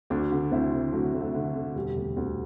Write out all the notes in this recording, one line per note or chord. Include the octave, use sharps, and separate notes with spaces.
D2 D4 F#4
D3
D2 C4 E4
D3
D3 F#3 A3
D2
F#3 A3
D3
D3
E1 G3
D2
D2